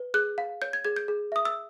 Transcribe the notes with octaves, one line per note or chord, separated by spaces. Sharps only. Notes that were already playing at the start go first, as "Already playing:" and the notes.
Already playing: B4
G#4 F#6
F5
C#5 G6
G#6
G#4 G#6
G6
G#4
E5 D#6
E6